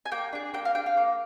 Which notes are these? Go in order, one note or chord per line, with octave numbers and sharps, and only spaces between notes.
G#5
A#3 G5
D4 G#4
A#3 G5
F5
D4 G#4 G5
F5
A#3